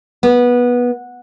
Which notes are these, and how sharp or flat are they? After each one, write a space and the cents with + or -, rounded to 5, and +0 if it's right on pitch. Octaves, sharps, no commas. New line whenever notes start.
B3 -15